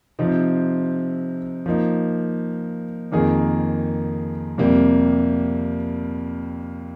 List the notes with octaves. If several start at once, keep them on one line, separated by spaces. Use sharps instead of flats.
C3 F3 C4 D#4
F3 A#3 D#4
F2 D#3 A#3 D#4 G#4
F2 C3 G3 A#3